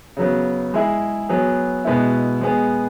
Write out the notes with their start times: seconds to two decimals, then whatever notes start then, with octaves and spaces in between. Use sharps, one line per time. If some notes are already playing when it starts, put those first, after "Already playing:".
0.17 C#3 F#3 B3
0.74 G#3 E4 G#4
1.29 F#3 B3 G#4
1.85 B2 G#3 B3 E4
2.41 G#3 B3 G#4